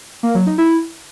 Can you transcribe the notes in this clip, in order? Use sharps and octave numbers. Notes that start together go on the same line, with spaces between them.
A#3
F#3
D#4
E4